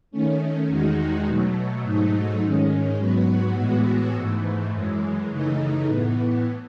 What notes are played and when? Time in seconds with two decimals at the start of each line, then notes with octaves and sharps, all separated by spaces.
0.11 D#3 A3 C#4
0.68 E2 D#3 G#3 D#4 F#4
1.27 B2 F#3 A3
1.83 G#2 F#3 A3 D#4
2.42 G#2 D#3 G#3 C#4
2.98 G#2 F#3 B3 F#4
3.57 A2 E3 G#3 B3 F#4
4.14 G#2 E3 A3
4.72 F#2 E3 G#3
5.28 F#2 C#3 E3 A3 D#4
5.86 A2 E3 B3